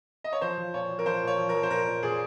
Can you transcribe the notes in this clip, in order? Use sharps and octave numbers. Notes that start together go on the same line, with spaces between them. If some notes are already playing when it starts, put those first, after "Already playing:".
D#5
C#5
F3 C5
F3
A#2 C#5
F3
A#4
F3 C5
A#2
C#5
F3
A#4
F3
C5
A#2 A#4
A#2
A#2 G#4